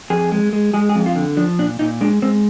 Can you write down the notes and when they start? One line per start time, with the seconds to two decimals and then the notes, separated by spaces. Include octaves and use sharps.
0.10 F2 G#4
0.32 G#3
0.53 G#3
0.74 G#3 G#4
0.89 G#4
0.95 F2
1.06 F4
1.16 D3
1.37 F3 D4
1.59 A#2 D4
1.79 A#2 D#4
2.01 G#3 D4
2.22 G#3 C4